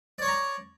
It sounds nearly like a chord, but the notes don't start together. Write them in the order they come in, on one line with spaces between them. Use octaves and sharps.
D5 C#5 C#6 A#5